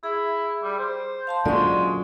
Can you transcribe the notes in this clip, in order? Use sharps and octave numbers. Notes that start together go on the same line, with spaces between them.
E4 G#4
G3
C5
F5 A5 C6
F#2 A#2 D3 G#3 D5 C#6